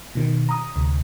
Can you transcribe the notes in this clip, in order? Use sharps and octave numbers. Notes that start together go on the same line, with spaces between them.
B2 D#3
A#5 D#6
D2 C3